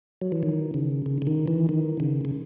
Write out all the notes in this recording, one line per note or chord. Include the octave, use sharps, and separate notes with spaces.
F#3
E3
D#3
C#3
C#3
C#3
D#3
E3
D#3
C#3
C#3